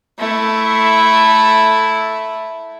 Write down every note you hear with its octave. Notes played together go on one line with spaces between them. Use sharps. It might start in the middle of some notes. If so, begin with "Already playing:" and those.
A3 E4